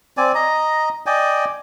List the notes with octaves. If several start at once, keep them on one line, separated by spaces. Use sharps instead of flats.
C4 D5 G#5
D#5 A#5
D5 D#5 G5 G#5